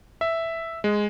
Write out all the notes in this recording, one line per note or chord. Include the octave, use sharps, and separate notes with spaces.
E5
G#3